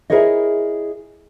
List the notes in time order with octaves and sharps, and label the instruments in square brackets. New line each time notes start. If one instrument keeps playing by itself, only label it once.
[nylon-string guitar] E4 G#4 A#4 C5 C#5 D#5